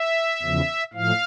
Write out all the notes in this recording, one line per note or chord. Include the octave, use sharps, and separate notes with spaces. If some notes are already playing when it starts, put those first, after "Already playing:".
Already playing: E5
E2 C#3 F3
A2 F3 F5